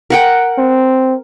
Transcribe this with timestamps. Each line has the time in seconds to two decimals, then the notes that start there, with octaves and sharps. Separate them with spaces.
0.10 A#4 F#5 G5
0.58 C4